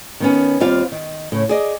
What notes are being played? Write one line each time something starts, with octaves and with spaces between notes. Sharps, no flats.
D#3 B3 C#4
D#2 G3 C4 F4 F5
D#3
A2 C#3
G#4 D5 D#5